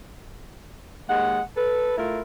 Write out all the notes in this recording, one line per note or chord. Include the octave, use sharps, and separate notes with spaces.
D#2 G#3 F#5
A4 B4
A3 E4 F4 A#4